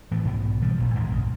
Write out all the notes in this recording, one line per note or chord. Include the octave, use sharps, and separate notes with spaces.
A2 E3 F3
B1 G#2 B2 B3
E3 F3 G3
D1 B1 A#2
D#2 G#2 D#3 G#3
A#1 F#2 C#3